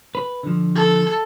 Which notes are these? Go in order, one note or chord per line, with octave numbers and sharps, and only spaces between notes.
B4
D3 F3
A4